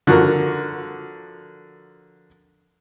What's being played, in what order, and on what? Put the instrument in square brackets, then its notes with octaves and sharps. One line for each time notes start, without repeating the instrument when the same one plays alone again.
[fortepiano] D3 F3 F#4 A#4